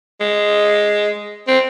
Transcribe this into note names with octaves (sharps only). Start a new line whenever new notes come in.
G#3
C4